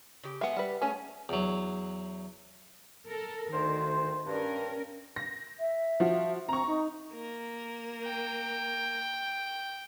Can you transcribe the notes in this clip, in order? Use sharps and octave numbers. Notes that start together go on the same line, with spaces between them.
C#3 G4
G#3 B3 E5 F#5
G3 B4
A3 C#4 G#4 G#5
E2 F#3
A4 A#4
D2 D#3 C5
G2 C#4 A#4
A#6
E5
F3 F#4
C4 A#5 C#6
D#4
A#3 A#4
G5